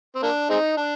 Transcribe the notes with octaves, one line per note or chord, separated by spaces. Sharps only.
C4
A#3 D4
G#3 C4 D#4
D4